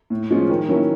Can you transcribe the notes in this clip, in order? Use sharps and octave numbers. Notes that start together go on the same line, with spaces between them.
A2
F3 G#3 C#4 F4
D#3
F#3 A#3 C#4 E4